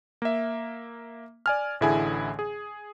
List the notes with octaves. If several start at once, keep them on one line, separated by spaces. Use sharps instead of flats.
A#3 E5
D5 G#5 F6
A1 D3 E4 G#4 G#5
G#4